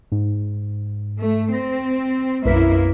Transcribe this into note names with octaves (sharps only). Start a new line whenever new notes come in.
G#2
A3
C4 A#6
B1 F#2 A#3 E4 B4 B6